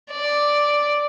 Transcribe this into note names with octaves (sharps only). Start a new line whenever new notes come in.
D5